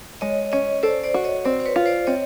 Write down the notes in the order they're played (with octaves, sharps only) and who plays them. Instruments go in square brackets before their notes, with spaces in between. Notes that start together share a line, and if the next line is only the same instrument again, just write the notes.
[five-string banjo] G#3 [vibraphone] C#5 D#5
[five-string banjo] C#4 [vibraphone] C#5 D#5
[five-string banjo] A4 [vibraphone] C5 D5
[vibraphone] C5 D5
[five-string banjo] F#4
[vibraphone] C#5 D#5
[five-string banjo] C4 [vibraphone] C5 D5
[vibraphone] C5
B4 C#5
[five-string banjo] F4
[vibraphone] C5 D5
[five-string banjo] C4 [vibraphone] C#5 D#5